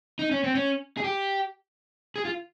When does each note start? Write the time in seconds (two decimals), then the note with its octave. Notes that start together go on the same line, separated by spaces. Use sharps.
0.19 D#4
0.31 C#4
0.44 C4
0.55 C#4
0.97 G#4
1.04 G4
2.16 G#4
2.25 F4